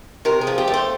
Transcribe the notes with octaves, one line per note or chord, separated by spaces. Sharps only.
C3 A#4
G#4
F3
G4
A3
C5